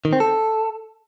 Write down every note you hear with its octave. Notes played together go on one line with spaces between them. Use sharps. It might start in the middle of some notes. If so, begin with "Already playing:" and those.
D#3
C4
A4